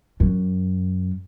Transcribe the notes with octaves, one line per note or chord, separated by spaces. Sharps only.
F#2